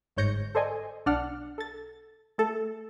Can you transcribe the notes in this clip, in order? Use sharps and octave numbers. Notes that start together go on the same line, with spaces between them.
G1 G#2 C#5 G6 A#6 C#7
A4 C5 D5 D#5 G#5
B1 D4 D5 F#5 F6
A4 A6
A3 A4